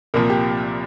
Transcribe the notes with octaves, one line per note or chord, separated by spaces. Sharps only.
C2 A#2 F3 A#4
G4